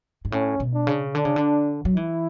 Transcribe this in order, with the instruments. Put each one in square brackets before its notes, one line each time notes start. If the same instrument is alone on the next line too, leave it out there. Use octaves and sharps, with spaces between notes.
[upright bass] G#2
[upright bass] A2 [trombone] C#4
[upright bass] B2
[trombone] D4
[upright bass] C#3
[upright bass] D3 [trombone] D4
[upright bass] C#3
D3
F#3
[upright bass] E3 [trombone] E4